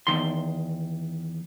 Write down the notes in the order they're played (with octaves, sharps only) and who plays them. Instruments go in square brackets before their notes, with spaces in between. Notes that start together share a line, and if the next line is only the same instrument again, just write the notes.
[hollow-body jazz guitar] E2 G2 D#3 C6